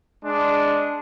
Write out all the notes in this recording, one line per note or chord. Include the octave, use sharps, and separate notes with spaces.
G#3 D4